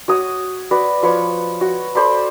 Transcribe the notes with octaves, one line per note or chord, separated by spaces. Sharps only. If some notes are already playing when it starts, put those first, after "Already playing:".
F#4 C#5 D#6
F#4 B4 D5
F3 B4 C#5 C#6
F#4
A4 C5 D5 B5